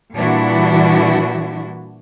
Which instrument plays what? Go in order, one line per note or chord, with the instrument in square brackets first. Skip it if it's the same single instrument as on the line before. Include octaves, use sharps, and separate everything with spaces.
[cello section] A#2 E3 G3 D4 E4 F#4